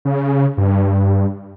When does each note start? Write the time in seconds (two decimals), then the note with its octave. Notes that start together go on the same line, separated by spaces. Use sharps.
0.05 C#3
0.57 G2